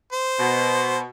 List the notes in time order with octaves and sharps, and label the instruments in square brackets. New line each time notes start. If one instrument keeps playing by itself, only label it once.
[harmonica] C5
[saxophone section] B2